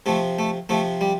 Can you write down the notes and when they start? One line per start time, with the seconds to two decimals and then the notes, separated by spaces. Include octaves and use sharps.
0.06 C3 F3 A3
0.39 A3
0.69 C3 F3 A3
1.01 G3